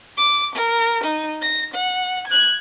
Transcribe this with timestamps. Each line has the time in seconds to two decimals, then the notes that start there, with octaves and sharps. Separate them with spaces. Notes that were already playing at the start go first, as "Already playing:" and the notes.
0.17 D6
0.55 A#4
1.03 D#4
1.42 A#6
1.74 F#5
2.27 F#6 G#6